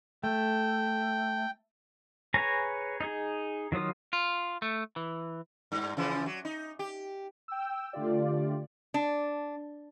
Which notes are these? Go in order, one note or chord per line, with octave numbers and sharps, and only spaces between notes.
A3 G5
G#4 B4 C#5 G#5 A#5
D#4 G#4
D#3 F#3 F4 D#6
F4
A3
E3
G2
C#3 E3 F3
F#3
D#4
G4
G5 E6
D3 A3 F4 G4 D5
D4